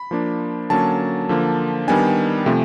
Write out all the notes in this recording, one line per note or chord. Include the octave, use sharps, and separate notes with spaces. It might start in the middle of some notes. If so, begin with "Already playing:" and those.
Already playing: B5
F3 A#3 D4
D3 F#3 A#3 C#4 A5
D3 F3 A#3
D#3 G3 B3 D4 G#5
C3 F3 A3